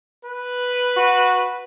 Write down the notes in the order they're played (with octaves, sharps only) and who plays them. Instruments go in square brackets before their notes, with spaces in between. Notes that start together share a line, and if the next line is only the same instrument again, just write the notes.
[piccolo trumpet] B4
[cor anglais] F#4